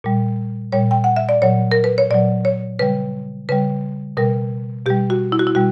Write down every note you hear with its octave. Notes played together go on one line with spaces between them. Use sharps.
A#2 G3
A#2 G3 C#5
G5
F#5
E5
D5
A#2 F#3 C#5
A#4
B4
C#5
A#2 F#3 D5
C#5
C#3 G3 B4
C#3 G3 B4
B2 G3 A#4
B2 G3 G4
F#4
E4
F#4
E4
B2 G3 F#4